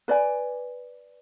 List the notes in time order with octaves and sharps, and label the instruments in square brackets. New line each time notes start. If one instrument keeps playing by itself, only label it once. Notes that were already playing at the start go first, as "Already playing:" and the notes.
[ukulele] B4 D5 G#5